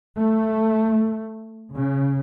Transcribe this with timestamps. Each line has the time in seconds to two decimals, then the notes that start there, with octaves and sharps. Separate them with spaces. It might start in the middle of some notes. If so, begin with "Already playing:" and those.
0.17 A3
1.74 C#3